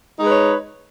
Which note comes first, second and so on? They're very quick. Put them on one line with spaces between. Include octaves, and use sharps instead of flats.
D#4 G#3 B4 C#5